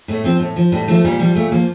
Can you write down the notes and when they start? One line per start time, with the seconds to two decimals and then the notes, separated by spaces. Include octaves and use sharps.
0.08 A2 A3
0.24 F3 C4
0.40 A2
0.56 F3
0.72 A2 G3
0.88 F3 A3
1.04 A#2 G3
1.19 F3 G3
1.35 A#2 A3
1.52 F3 A#3